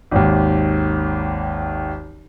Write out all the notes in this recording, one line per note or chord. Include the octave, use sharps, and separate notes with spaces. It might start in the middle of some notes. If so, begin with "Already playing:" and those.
G#1 D#2